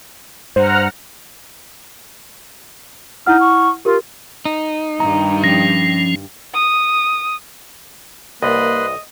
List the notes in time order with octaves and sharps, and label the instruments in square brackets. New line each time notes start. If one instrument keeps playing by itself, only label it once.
[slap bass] G2 [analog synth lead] C5 [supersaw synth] F#5 A#5 F6
[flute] D#4 [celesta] E4 F#5 F6
[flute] C#6
[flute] F4 [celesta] G4 A#4
[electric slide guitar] D#4
[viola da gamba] G2 D#3 G3 [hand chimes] A#5
[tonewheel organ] F3 C#4 [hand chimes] A#6
[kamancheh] D#6
[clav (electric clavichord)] C2 [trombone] A#3 [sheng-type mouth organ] B4 B5 C6 [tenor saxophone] D#5